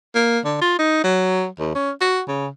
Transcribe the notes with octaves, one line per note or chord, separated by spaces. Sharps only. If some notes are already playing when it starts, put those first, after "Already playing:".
A#3
D3
F4
D#4
F#3
D#2
C#4
F#4
C#3